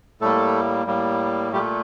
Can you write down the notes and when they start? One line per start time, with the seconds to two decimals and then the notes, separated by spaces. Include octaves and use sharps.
0.21 A2 G3 A3 A#3 A4
0.87 A2 G3 A#3
1.53 A#2 G3 A3 G4